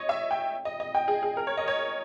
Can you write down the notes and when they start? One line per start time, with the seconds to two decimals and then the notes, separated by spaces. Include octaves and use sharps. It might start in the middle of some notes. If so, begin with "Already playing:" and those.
Already playing: C#5 D#5
0.09 E5
0.31 G5
0.65 D#5
0.80 D#5
0.95 G5
1.08 G#4
1.23 G#4
1.37 A#4
1.47 C#5
1.57 D#5
1.68 C#5